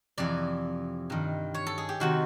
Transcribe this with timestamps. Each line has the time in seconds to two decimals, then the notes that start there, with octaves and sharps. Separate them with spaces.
0.18 F2 C3 E3 D5
1.10 G2 D#3
1.54 C#5
1.67 A4
1.78 G#4
1.89 G4
2.00 C3 D#3 F#4